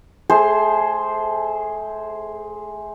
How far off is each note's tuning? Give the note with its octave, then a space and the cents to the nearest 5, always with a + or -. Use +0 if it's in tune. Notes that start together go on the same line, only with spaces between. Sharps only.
A3 -25 G#4 +0 C5 +0